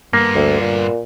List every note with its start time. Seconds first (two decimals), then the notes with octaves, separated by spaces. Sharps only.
0.13 G2 A#3 B3
0.35 D2
0.61 A#2